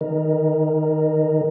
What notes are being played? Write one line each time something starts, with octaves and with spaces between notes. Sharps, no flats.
D#3